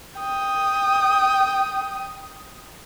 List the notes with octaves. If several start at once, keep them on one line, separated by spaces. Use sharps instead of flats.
G5 D#6